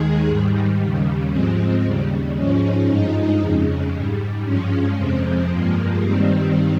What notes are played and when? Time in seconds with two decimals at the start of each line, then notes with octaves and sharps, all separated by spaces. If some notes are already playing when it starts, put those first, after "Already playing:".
Already playing: D#2 D#3 G#3 G#4
0.27 G#2 D#3 G3
0.80 D#2 C#3 G3
1.32 G#2 F3 G#3 C4
1.84 D#2 C#3 G3
2.36 G#2 F3 G#3 C#4
2.88 G2 F3 G#3 D#4
3.40 F2 C#3 G#3
3.93 G#2 G3
4.44 G2 F3 G#3 C#4
4.96 F2 C3 F3 G#3 C4
5.48 G2 F3 G#3 A#3
6.00 G2 D#3 G3 C4